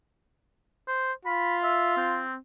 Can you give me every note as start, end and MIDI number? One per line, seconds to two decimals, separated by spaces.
0.87 1.13 72
1.25 2.25 65
1.25 1.57 83
1.63 1.92 76
1.97 2.36 60